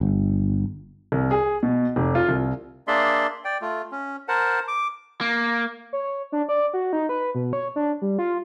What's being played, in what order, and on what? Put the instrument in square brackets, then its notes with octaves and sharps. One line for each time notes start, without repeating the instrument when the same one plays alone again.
[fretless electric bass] G1
[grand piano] C2
G#4
B2
F1
F4
C2
[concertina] A#3 D4 G#4 D5 E5 C6
D5 G5
A3 F4
C#4
A#4 C5 F#5 A5
D6
[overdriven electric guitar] A#3
[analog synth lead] C#5
D4
D5
F#4
D#4
B4
B2
C#5
D4
G3
F4